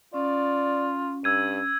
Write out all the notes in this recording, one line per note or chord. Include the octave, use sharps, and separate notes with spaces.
C#4 F4 D5
G2 E6 G#6 D#7